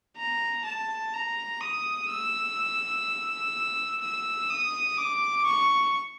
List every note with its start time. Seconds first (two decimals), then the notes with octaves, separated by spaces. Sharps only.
0.17 A#5
0.65 A5
1.13 A#5
1.60 D#6
2.09 E6
4.01 E6
4.50 D#6
4.98 D6
5.46 C#6